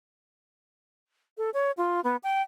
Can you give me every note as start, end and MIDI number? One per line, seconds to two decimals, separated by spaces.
1.38 1.50 69
1.54 1.71 73
1.77 2.01 65
2.04 2.16 59
2.23 2.42 79